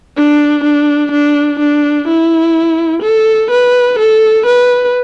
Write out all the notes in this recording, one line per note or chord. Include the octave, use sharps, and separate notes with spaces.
D4
D4
D4
D4
E4
A4
B4
A4
B4